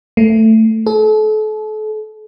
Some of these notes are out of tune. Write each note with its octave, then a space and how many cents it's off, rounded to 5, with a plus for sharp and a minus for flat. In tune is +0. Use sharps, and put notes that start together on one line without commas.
A3 +10
A4 -35